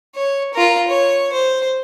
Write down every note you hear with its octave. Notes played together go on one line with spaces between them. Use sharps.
C#5
F4 A#4
C#5
C5